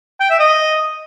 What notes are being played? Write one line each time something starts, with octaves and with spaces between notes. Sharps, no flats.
G5
E5
D#5